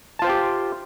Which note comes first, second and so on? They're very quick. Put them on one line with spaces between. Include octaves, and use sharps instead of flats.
A5 F4 C5 G5 G4